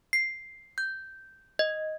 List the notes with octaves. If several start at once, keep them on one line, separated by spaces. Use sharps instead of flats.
C7
G6
D#5